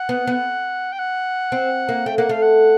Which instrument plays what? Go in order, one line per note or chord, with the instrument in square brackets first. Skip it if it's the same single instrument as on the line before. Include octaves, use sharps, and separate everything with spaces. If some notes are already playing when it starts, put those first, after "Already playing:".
Already playing: [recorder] F#5
[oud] B3
B3
[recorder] G5
F#5
[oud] C4
A#3
[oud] A3 [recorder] G5
[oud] A#3 [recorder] F#5
[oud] A3 [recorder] F5
[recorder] F#5